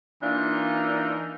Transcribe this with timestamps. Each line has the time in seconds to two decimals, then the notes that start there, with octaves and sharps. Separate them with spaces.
0.22 E3 A#3 D4 D#4 F4